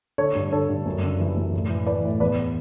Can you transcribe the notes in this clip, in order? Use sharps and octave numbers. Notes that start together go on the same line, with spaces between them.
D3 A4 C#5
G2
D3 A4 C#5
G2
F#2
C#3
E3
F#2
A2
E3
E3 B4 D5
A2
E2 B4 D5